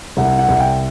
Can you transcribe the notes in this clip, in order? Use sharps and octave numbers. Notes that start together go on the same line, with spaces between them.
C2 F#5
F#5
C2
G5